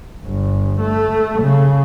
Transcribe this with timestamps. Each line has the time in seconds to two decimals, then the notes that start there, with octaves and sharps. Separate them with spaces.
0.25 G1
0.80 A3
1.42 C#3